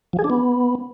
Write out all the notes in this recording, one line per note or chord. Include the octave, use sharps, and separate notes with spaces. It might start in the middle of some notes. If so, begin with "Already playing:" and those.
F3
G#4
D4
B3